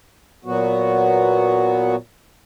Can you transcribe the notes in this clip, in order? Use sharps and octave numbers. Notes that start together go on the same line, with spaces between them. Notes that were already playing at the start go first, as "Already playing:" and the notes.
A#2 F#3 B3 F#4